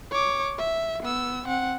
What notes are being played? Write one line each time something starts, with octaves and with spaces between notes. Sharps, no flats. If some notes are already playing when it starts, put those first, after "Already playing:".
C#5 D6
E5
B3 E6
C4 F#5